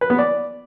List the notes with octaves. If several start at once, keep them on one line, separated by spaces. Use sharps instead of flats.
B4
B3
D5